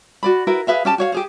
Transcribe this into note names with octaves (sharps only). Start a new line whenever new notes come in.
F#4 D5 B5
E4 F#4 A#4 B4
G#4 B4 E5 F5
C#4 G4 A5
F#4 C#5 F5
G4 G#4 C5